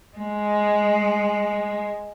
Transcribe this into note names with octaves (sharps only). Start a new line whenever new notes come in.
G#3